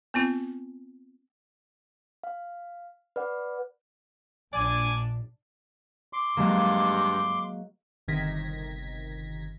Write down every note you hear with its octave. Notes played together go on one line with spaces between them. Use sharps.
B3 C4 F4
F5
B4 D5 F#5
A#1 D4 D5 G#5
C6 D6
G2 F#3 G#3 A#3
G1 C3 D#3 G#6 A#6 B6